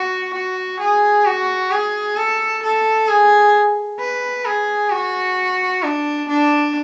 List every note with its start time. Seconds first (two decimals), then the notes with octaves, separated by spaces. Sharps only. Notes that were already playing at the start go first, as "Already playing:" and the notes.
Already playing: F#4
0.34 F#4
0.80 G#4
1.25 F#4
1.71 G#4
2.17 A4
2.63 A4
3.08 G#4
3.99 B4
4.45 G#4
4.91 F#4
5.83 D4
6.28 D4